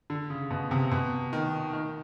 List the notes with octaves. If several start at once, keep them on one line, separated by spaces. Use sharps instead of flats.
D3
C#3
B2
C3
B2
D#3
D#3